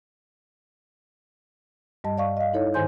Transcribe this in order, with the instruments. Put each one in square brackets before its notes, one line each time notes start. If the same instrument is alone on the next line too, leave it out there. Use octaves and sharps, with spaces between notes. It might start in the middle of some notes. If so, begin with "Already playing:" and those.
[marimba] G2 G3 D#5 A5
D5 F5 C#6
D#5 F5
D#4 E4 A4 C#5
G#2 D#3 C5 G#5 C6 G6